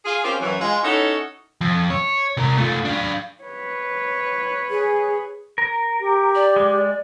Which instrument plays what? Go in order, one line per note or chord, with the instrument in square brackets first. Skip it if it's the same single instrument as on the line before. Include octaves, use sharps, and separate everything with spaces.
[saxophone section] F4 G#4 F5
C4 C#4 F4 G4 A#4 C5
F#2 E3
G#3 F4
C#4 D#4 E4 F#4 A4 C#5
[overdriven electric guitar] F2
C#5
C3 A#4
A3 F4
D4 F5
[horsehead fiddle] B4 C#5
[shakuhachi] G#4
[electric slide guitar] A#4
[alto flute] G4
[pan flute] D5
[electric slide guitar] G#3